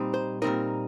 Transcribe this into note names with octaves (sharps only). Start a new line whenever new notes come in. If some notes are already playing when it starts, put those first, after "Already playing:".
Already playing: A#2 G3 C4 D#4
C5
A#2 G3 C4 D#4 A#4